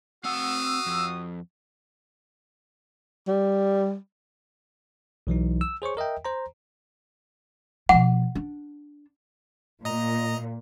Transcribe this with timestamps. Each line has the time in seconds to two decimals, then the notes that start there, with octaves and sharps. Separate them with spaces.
0.25 C4 F#4 F5 F#5 D#6 E6
0.87 F2
3.28 G3
5.27 B1 E3 F#3 D#4
5.61 E6
5.82 G#4 C5 C#5 C#6
5.97 A#4 D#5 E5 G5
6.25 C5 A#5
7.89 B2 F3 F#5
8.35 D4
9.85 A#2 D#5 A#5